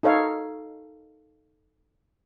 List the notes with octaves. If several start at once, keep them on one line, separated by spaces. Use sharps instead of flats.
D#4 A4 C#5 F5